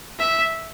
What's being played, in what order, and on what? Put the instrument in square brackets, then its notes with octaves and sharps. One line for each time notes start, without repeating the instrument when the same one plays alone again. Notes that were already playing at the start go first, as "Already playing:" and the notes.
[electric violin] E5